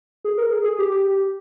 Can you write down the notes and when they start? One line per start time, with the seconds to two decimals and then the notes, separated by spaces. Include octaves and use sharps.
0.24 G#4
0.38 A#4
0.51 G#4
0.64 G#4
0.79 G4